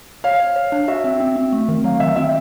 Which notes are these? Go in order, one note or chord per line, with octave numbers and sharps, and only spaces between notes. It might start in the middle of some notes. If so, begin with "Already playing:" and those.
C#5 F5
C#5
C#5
D4
F#4 E5
C4
C4
C4
A3
D#3
F#3 F5
D#3 E5
C4 E5